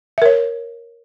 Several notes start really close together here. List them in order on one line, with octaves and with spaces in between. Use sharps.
E5 A#4 C#5